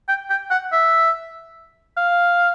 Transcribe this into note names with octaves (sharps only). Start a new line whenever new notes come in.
G5
G5
F#5
E5
F5